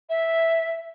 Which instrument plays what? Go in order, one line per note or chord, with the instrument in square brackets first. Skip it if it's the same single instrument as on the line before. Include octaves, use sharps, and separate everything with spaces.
[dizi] E5